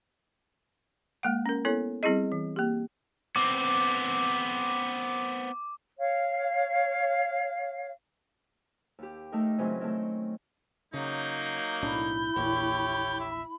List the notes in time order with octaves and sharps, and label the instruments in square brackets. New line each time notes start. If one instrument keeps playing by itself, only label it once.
[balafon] G#3 A#3 F#5
C#4 A#4
B3 E4 A4 C#5
G3 C4 E4 G#4 D#5
E3
A#3 G4
[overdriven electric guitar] B3 C4 [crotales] D6
[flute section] C#5 F5
[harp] D#2 G4
A3 D#4 A#4
C#3 E3 F#3 G#3 C4 C#4
D#3 A3
[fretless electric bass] C#3 [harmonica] F#3 A#3 D#4 [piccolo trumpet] G6
[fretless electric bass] B1 A2 D4 [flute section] E4 B5
[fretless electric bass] A#1 E2 A#2 [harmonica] G4 C#5
[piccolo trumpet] E5